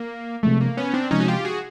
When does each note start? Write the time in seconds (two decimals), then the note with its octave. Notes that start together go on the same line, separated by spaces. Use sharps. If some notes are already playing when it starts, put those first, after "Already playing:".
Already playing: A#3
0.43 C3 F3 G#3 A3
0.61 A#3
0.77 B3 C#4
0.94 C4 D4
1.11 C3 F3 G#3 C#4 D#4
1.20 F#4
1.28 F4 G4
1.45 F#4 G#4